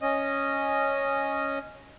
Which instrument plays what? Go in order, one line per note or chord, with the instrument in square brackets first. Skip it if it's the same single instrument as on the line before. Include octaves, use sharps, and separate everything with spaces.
[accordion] C#4 D#5